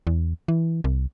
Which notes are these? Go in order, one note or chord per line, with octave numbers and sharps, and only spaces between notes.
E2
E3
C2